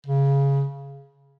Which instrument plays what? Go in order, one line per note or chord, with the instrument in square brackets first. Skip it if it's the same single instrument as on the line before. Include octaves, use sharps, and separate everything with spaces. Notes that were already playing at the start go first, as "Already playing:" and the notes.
[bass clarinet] C#3